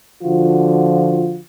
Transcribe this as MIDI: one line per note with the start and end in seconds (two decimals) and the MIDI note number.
0.23 1.39 50
0.23 1.39 53
0.23 1.39 65
0.23 1.39 66